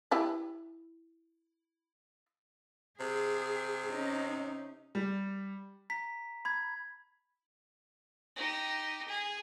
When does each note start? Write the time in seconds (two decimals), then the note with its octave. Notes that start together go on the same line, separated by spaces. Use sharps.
0.11 E4 G4 B4
3.00 C3 G#4
3.91 C#4 D#4
4.95 G3
5.90 A#5 B6
6.45 B5 G#6
8.36 D#4 G4
9.07 G#4